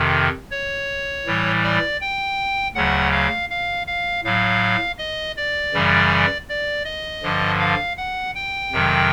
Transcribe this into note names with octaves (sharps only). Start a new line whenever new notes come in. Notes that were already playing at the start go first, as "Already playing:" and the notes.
Already playing: F2 C3 D#3
C#5
A2 E3 G3
D5
G5
D2 C#3 F#3 F#5
F5
F5
F5
A2 F#3 F5
D#5
D5
F#2 C#3 E3 G3
D5
D#5
G2 D3 F3
F5
F#5
G5
F2 C3 D#3 F#3